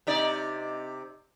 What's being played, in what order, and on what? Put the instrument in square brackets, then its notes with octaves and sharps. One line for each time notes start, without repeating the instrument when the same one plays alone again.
[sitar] C3 D#4 D5